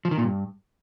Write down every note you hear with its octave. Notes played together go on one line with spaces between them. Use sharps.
F3
D#3
A#2
G2